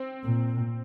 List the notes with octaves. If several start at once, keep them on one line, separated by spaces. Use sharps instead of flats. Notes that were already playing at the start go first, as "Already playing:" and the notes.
Already playing: C4
A#2